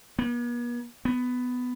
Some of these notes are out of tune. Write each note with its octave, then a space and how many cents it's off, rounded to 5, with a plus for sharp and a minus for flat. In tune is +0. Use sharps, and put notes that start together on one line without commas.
B3 -45
B3 +10